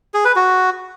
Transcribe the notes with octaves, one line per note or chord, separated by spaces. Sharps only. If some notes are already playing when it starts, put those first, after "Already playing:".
G#4
B4
F#4